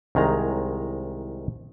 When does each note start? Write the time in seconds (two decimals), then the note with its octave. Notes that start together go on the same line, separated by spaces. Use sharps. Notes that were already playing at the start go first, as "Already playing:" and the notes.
0.15 C2 D#3 G#3 A#5